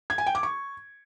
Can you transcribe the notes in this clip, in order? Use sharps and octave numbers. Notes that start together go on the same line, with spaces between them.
G#6
G#5
G5
D6
C#6